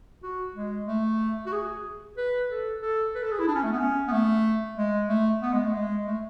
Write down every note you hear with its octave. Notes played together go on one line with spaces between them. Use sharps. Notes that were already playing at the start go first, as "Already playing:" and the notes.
F#4
G#3
A3
F#4
G#4
B4
A4
A4
B4
A4
G#4
E4
D4
C#4
A3
B3
C#4
B3
A3
G#3
A3
B3
G#3
A3
G#3
A3